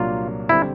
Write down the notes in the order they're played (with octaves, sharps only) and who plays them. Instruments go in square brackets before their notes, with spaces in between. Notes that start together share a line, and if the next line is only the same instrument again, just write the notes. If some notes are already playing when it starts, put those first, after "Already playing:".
Already playing: [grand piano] C2 A#2 F#3 A#3 D4 [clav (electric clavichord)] F4
[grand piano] D3 G3 C4 [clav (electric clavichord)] E4